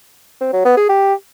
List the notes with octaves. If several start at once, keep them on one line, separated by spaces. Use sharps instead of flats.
C4
F#3
B3
G#4
G4